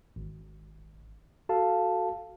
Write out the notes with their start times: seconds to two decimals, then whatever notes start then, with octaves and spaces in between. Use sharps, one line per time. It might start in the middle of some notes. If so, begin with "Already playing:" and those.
0.16 G#1
1.49 F#4 A4 F5 A5